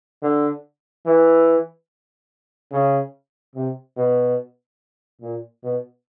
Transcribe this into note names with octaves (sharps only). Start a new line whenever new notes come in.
D3
E3
C#3
C3
B2
A#2
B2